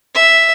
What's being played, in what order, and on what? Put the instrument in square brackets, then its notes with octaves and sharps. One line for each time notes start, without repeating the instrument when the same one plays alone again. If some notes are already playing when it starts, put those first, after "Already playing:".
[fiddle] E5